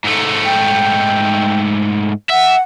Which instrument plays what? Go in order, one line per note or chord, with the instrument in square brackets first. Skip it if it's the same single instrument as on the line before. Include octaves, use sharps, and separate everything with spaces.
[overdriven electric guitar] G#2 A3
[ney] G5
[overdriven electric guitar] E5 [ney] F#5